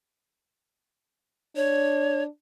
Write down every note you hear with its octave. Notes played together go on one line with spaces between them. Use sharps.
D4 C#5